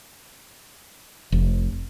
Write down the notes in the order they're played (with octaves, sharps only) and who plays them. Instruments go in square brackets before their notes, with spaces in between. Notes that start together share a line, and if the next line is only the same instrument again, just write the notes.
[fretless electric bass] F1